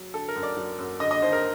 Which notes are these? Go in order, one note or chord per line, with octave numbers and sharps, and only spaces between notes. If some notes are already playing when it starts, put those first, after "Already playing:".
Already playing: F#3
D3 A4
A#4
F#2
D5
F#3
F#2
D3 D#5
D#5
D#2 C5
A#4